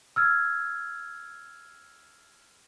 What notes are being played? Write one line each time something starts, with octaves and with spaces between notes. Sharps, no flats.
E6 F6 G#6